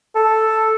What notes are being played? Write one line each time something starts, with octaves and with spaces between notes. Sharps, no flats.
A4